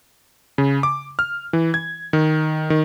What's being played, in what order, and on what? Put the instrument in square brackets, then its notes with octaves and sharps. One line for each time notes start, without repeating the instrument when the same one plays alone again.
[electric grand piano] C#3
D6
F6
E3
G#6
D#3
D#3